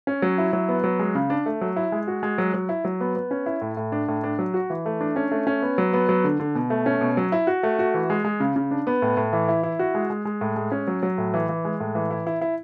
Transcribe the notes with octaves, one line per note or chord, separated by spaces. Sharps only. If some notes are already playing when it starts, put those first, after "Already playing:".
C#4
F#3
E4
F#3
B3
F#3
G#3
C#3
D4
A3
F#3
E4
G#3
F#4
G#3
F#3
F#3
E4
F#3
B3
B3
C#4
E4
A2
A2
D4
A2
D4
F#3
F#4
E3
A3
D4
C#4
A3
C#4
B3
F#3
B3
F#3
D3
D3
B2
A3
C#4
B2
F#3
E4
F#4
A3
F#4
E3
G#3
G#3
C#3
C#3
D4
B3
A2
A2
E3
E4
E4
F#4
G#3
G#3
G#3
A2
G#3
C#4
F#3
F#3
A2
E3
E3
G#3
A2
E3
E4
E4
E4